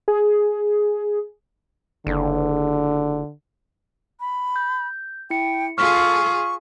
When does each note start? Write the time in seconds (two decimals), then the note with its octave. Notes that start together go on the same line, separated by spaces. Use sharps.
0.08 G#4
2.07 F#1 D3
4.20 B5
4.56 G6
5.30 E4 G5 C#7
5.78 F4 G#4 A4 C#6 F6 B6